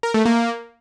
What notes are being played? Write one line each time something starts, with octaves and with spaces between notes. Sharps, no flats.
A#4
A3
A#3